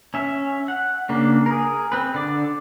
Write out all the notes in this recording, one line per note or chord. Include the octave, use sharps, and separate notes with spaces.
C#4 E5
F#5
C#3 A#3 D4
G#4 A#4
C4 B4
D3 D5